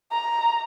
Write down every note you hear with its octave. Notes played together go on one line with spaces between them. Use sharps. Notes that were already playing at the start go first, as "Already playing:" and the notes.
A#5